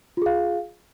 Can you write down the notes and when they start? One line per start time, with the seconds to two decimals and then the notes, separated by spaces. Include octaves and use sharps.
0.17 F4
0.22 G#4
0.26 F5